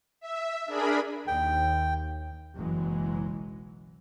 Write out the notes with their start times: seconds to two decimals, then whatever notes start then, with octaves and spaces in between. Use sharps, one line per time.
0.20 E5
0.66 D4 G#4 A#4 B5
1.27 D#2 G5
2.56 F#1 B1 E3 F#3 G#3